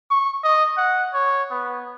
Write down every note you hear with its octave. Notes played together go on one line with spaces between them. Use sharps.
C#6
D#5
F#5
C#5
B3